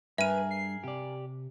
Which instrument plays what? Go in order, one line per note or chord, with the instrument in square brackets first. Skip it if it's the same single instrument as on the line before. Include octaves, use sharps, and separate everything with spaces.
[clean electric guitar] G2 [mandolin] G#4 A#4 [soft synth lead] B4 [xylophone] E5 D#7
[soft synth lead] C7
[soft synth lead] C3 [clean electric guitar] G4 D5